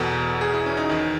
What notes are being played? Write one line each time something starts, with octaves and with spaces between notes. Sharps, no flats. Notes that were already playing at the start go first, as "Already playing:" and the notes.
Already playing: E2 B2 A4
G#4
E4
C#4
D#4
E2 D#3